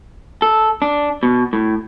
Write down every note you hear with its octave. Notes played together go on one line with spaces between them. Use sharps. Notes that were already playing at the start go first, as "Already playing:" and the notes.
A4
D4
B2
A2